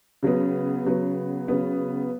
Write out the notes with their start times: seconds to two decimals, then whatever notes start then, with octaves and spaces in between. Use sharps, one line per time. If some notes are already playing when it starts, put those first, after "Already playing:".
0.23 C#3 F#3 B3
0.85 C#3 F#3 B3
1.48 C#3 F#3 B3